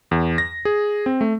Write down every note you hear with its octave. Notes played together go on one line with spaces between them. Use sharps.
E2
A#6
G#4
C4
A3